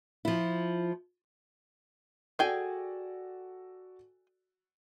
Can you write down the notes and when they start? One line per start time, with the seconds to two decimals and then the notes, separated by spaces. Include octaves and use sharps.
0.25 F3 E4
2.39 F#4 G#4 A4 D5 G5 G#5